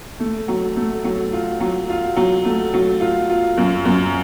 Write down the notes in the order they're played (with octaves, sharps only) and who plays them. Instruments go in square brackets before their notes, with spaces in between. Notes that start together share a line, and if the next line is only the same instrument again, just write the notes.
[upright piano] A3
F#3
A3
F#3
F4
F#3
F4
F#3
A3
F#3
F4
F4
F#2
F#2